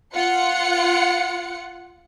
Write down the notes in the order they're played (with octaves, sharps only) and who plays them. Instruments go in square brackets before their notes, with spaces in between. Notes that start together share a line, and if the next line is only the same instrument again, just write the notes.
[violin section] F4 F#5 C#7